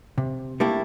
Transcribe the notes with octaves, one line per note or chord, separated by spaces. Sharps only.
C3
G3 A3 A#3 D4 E4 G4